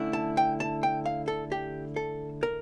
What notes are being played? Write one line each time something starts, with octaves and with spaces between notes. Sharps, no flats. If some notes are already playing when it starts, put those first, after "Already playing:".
Already playing: D3 A3 C#4 E4
A5
G5
A5
G5
F5
A4
G4
A4
A#4